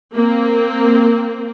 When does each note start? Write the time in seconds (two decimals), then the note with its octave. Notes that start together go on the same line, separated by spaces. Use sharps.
0.14 A#3 C4